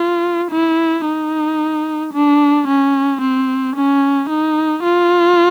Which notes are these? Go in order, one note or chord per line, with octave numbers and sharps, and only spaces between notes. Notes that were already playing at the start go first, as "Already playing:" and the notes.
Already playing: F4
E4
D#4
D4
C#4
C4
C#4
D#4
F4